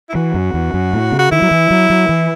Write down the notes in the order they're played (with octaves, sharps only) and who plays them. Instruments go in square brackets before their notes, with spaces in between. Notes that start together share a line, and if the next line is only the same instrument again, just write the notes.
[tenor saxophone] E4
[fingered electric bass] E3 [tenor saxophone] F#4
[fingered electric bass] F#2
E2
F#2
A2
C#3
[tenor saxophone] F#4
[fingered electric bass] D#3 [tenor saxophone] E4
[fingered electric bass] F#3
E3
F#3
F#3
E3